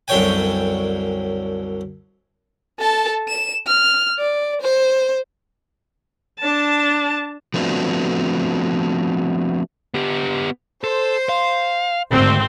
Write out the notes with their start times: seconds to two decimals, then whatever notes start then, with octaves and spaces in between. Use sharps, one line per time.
0.08 C2 F#2 D3 C#5 G5 G#5
2.79 A4 A5
3.28 E7
3.67 F6
4.18 D5
4.61 C5
6.40 D4 A5
7.54 F3 A3 B3 C4 D4 F#4
9.94 B3 G4
10.84 A4 C5
11.29 F5
12.12 G#1 D2 C4